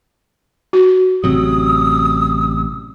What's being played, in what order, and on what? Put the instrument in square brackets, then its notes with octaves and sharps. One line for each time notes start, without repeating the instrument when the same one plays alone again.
[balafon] F#4
[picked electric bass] A1 C3 F#3 [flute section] D#6 E6